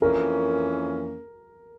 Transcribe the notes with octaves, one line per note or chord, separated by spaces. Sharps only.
F2 E3 A#3 C#4 A#4